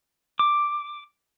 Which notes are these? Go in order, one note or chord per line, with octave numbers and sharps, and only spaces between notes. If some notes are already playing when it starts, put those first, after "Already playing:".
D6